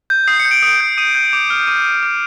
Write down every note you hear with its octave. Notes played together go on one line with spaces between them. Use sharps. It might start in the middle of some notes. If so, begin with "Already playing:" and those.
G6
D#6 C7
C#7
G6
D7
D#6
G6
D#6 D#7
G6
D6
F6
D6 D#7
F6
D6